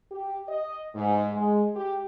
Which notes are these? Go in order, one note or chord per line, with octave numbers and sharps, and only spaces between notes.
G4
D#5
G#2
G#3
G4